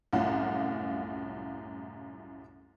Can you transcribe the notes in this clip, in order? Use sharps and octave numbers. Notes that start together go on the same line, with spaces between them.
C2 F#2 A2 F4 F5 F#5